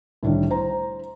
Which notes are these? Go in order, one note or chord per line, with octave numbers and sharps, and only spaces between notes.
C2 A2 D3 D#3 G3
E4 C5 A#5